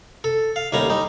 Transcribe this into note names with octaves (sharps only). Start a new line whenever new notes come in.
A4
F5
D#2 A2 G3 C#4 A#5
G3 D#4